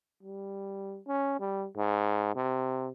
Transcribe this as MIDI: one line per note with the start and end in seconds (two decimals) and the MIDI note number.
0.23 1.00 55
1.07 1.35 61
1.40 1.67 55
1.76 2.33 44
2.35 2.90 48